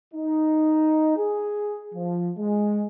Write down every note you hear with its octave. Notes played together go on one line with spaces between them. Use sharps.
D#4
G#4
F3
G#3